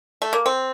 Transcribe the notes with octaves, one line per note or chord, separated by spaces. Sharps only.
A3
A#3
C4